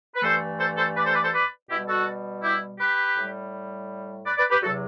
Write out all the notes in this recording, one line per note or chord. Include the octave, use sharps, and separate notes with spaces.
B4
G2 E3 A3 A4 C5
A4 C5
A4 C5
B4 D5
A4 C5
B4 D5
A4 C5
B4 D5
B2 G3 E4 G4
F#4 A4
E4 G4
G4 B4
A2 G3
B4 D5
B4 D5
G4 B4
E2 C3 F#3 F#4 A4